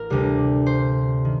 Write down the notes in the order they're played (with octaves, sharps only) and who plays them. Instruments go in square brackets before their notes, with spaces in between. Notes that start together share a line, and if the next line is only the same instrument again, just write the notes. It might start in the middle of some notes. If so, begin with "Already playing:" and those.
Already playing: [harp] A1 A#4
D2 C3 G3
C5
D#3